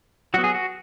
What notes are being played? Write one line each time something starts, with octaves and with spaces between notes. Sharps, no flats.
F#3 B3 F#4
G#4
F#4